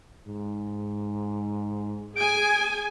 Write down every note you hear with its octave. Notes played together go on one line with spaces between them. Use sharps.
G#2
G#4 G#5 D7